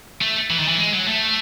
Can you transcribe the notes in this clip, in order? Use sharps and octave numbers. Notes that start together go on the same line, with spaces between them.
A3
E3
D#3
E3
G#3
F#3
A3